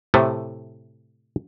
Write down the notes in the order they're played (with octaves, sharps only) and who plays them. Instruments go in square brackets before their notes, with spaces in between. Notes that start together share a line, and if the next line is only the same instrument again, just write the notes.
[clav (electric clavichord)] A2 C3 A3